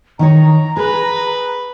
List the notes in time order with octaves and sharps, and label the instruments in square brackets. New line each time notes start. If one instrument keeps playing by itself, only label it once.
[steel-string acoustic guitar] D#3 D#4 C#5 [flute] A#5
[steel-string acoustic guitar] G#4 [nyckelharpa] B4